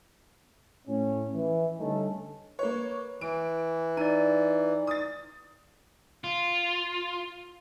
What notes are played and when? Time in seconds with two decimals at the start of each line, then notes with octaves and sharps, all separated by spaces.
0.87 A2 C#4
1.34 E3
1.79 D3 G3 A3 C#4 D#4 A4
2.59 A#3 B4 C#5
3.21 E3 D7
3.97 D#4 D5 D#7
4.87 D#6 A6
6.24 F4